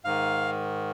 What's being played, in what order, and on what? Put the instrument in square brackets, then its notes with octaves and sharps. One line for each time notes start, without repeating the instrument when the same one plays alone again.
[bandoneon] G#2 D#3 F5